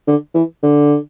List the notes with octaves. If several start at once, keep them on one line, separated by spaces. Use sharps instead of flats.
D3
E3
D3